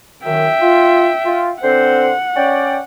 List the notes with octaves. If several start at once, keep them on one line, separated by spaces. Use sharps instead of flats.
F#2 D#3 E5 G5
F4
F4
D3 C4 C5 F#5
C#4 D5 G5